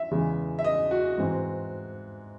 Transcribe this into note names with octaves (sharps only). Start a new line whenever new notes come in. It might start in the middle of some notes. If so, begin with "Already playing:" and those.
Already playing: E5
E2 C#3 E3 G#3
E5
D#5
F#4
G#2 E3 C4